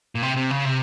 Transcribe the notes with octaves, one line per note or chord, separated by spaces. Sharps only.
A#2
C3
C3
C#3
C3